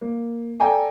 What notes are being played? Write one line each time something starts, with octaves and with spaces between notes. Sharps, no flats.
A#3
A4 D5 G5 G#5 A#5